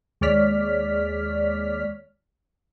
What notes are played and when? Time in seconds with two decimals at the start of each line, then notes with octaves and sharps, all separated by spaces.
0.21 D#2 G#3 C#5 D5 F6 B6